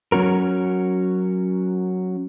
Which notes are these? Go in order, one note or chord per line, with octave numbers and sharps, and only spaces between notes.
F#3 C#4 F#4 A#4